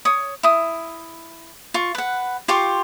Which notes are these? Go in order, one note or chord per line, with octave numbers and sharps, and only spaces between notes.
C#5 D#6
E4 D#6
F4 C#6
B4 F#5
F4 G4 C6 C#6